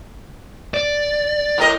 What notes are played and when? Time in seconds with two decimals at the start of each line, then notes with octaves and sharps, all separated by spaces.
0.74 D5
1.58 A2 A#4 D#5